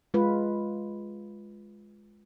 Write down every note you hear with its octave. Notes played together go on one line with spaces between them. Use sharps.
G#3 F4 B4